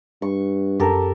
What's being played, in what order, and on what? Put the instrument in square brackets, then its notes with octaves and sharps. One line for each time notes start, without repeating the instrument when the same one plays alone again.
[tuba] G2 [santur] C#6
[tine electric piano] F#2 [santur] G4 A4 A#4